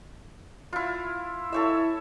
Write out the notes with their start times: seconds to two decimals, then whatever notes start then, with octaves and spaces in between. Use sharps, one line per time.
0.73 E4 F4
1.53 E4 A4 C#5 E5